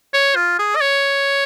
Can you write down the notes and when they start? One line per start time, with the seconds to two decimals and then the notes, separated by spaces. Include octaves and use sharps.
0.13 C#5
0.36 F4
0.59 G#4
0.76 D#5
0.81 C#5